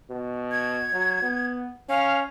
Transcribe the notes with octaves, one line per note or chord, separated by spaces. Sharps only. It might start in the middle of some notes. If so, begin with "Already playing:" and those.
B2
G#6
F#3
B3
C#4 F5